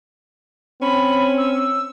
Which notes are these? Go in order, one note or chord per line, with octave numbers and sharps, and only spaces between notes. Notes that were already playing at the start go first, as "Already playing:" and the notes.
C4 C#4 B5
E6